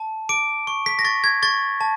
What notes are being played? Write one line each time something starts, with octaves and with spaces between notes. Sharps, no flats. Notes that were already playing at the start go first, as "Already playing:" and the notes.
Already playing: A5
D6 D7
C#6
B6
A#6
C#6 A6
G#6
C#6 A6
A5